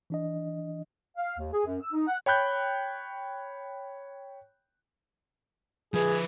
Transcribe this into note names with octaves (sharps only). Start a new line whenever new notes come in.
E3 D4 D#5
F5
D#2
G#4
F#2
E6
D#4
F#5
C#5 G5 B5 F#6 G6
F3 G#4 B4